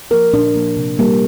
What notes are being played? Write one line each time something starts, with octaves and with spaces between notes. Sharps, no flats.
F3 A#3 A#4
A#2 D4
F3 A#3
C3
G3 A#3